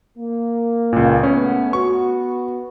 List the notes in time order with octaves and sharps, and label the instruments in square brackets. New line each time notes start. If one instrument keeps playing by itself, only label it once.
[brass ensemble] A#3
[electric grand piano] C#2 A#2
[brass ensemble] A3 B3 [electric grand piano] C#4
[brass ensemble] B3 F#4 [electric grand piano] C#6